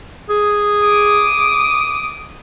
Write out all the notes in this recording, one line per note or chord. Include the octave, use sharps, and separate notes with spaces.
G#4
D6 D#6